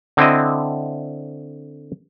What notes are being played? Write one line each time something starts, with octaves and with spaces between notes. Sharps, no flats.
D3 C4 E4 D#5